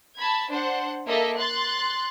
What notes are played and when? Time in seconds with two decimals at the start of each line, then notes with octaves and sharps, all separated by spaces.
0.17 A5 B5 G#6
0.49 D4 C5 F#5
1.08 A#3 A4 D#5 E5
1.38 C6 F#6 A6